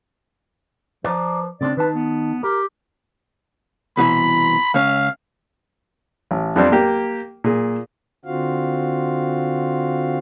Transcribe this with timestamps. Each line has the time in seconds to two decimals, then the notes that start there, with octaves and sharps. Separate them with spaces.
1.04 F3 B4 D5 A#5
1.61 C#3 C4 D4 D5
1.77 D#3 D#4 B4 A5
1.95 B3
2.43 G4 A#4
3.97 C2 B2 E3 B5
4.74 C#2 C#4 F5
6.31 A1
6.56 F2 G3 C4 D4
6.72 A#3 G4
7.44 A#2 G#4
8.25 D3 C4 F4 F#4 F5